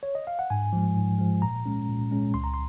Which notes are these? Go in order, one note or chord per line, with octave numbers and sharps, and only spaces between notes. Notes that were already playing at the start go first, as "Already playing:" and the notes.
C#5
D#5
F5
F#5
G#2 G#5
F3 G#3
G#2
F3 G#3
A#2 A#5
G#3 C#4
A#2
G#3 C#4
C#2 C6
A#5
C6